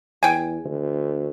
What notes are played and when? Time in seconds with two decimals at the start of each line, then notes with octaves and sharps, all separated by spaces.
0.23 E2 G5 G#5
0.64 D2